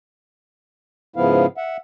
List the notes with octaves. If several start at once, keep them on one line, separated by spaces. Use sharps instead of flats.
G#2 C#3 F3 B3 E4 F5
E5 F#5